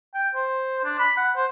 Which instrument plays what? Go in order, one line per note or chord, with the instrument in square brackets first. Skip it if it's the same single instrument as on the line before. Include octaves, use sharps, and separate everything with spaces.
[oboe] G5
C5
D4
B5
F#5
C5